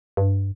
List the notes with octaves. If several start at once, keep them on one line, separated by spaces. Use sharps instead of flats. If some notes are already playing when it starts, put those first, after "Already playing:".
G2